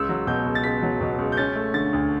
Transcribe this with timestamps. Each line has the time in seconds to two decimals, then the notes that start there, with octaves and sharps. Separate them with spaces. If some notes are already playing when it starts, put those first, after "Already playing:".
Already playing: C#2 E6
0.09 F#3
0.27 B2 G6
0.46 C#2
0.55 A6
0.64 C#2 B6
0.83 F#3
1.01 B2
1.18 C#2
1.32 G6
1.37 C#4 A6
1.55 A3
1.74 D3 A6
1.93 D2